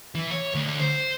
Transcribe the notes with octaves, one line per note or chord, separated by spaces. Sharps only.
E3
C#5
D2
C5